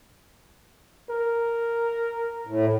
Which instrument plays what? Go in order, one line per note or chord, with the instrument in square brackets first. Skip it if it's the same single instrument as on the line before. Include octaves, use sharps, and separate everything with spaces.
[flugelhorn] A#4
[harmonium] A2